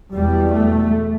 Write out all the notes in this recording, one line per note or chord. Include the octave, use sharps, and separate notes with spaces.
E2 B2 G3
A3